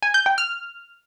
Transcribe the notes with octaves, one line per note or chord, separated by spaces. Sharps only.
G#5
G6
G5
F6